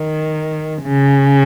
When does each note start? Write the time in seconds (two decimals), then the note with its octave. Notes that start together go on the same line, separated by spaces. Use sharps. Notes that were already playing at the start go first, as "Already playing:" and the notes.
Already playing: D#3
0.83 C#3